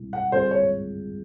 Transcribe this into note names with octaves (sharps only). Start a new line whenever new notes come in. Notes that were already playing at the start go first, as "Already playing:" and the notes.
Already playing: B2 G3 C4 E4
F#5
D3 G3 C4 F4 G#4 C5
C#5